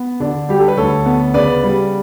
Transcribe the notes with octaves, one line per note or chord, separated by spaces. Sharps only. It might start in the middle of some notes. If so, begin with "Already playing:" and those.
Already playing: B3
D3 D4
G3 G4
A4
B4
D2 A4 C#5
B3
C#3 B4 D5
G3